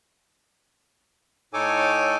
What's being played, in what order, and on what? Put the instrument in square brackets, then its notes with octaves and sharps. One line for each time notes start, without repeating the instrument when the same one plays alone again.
[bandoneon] A2 D#4 A4 C#5 G#5 D6